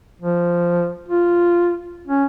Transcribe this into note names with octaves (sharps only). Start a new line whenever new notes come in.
F3
F4
C#4